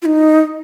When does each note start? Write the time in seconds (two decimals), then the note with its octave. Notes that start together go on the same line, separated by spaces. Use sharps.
0.02 F4
0.06 D#4